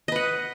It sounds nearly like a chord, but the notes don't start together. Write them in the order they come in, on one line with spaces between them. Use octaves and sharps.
D#5 B4 F#5